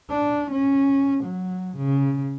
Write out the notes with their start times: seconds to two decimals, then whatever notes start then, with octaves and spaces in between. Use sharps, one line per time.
0.10 D4
0.51 C#4
1.24 F#3
1.77 C#3